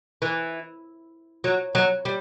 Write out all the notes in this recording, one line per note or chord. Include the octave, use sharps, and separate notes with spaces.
E3
F#3
F#3
G3